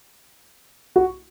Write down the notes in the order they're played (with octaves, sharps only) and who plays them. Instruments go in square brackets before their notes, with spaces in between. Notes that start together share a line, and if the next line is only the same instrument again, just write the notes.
[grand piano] F#4